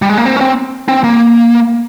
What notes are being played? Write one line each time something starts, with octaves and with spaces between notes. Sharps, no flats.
G3
G#3
A#3
C4
C#4
C4
C4
A#3